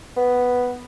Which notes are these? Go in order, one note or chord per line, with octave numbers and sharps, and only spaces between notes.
B3